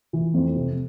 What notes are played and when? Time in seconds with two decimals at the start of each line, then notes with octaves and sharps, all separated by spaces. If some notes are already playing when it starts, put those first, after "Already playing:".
0.13 E3
0.34 F2
0.55 C3